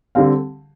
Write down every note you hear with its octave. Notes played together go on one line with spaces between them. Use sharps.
D3 G3 C4 F5